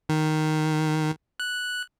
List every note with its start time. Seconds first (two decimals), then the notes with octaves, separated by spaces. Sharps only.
0.09 D#3
1.40 F#6